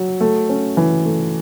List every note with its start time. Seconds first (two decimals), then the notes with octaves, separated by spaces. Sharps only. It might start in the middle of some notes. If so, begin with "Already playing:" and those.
Already playing: F#3
0.21 A3
0.49 C#4
0.77 E3
1.05 A3